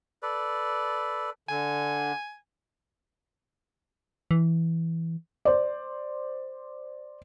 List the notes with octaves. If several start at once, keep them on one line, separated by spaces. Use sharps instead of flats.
A4 B4 D5
D3 G#5
E3
C5 D5